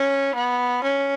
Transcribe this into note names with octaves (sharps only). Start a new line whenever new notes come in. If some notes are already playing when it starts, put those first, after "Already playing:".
Already playing: C#4
B3
C#4